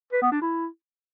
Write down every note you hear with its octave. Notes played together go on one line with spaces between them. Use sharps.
B4
B3
D4
E4